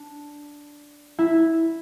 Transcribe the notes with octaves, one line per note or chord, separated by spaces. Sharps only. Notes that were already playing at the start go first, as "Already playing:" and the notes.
Already playing: D4
E4